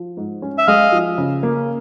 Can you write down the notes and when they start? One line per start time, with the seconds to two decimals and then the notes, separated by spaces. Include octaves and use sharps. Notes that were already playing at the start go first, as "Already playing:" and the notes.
Already playing: F3
0.17 G#2
0.42 C#4
0.58 E5
0.67 G#3 D#5 F5
0.92 F3
1.18 C#3
1.43 A#3